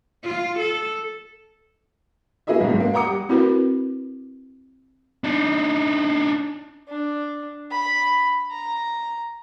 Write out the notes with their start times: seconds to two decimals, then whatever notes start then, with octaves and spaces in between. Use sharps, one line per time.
0.23 F4
0.59 A4
2.47 A#3 E4 G#4 B4 D#5 E5
2.60 B1 G#2
2.80 A#3
2.94 F#5 G5 A#5 D6 D#6 C#7
3.06 G3
3.29 C4 E4 F#4 A#4 B4
5.24 D4 D#4
6.89 D4
7.71 B5
8.51 A#5